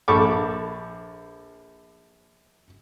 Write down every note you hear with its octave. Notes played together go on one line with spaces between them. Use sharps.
A#1 A4 B5 C#6 D6